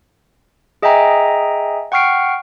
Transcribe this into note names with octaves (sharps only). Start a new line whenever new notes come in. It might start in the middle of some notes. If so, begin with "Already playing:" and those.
G#4 D#5 E5 G5 G#5 A#5
F#5 G5 C#6 F6 C7 D7